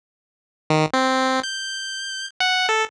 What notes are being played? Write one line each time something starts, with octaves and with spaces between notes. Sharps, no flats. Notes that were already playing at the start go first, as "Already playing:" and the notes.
D#3
C4
G6
F#5
A4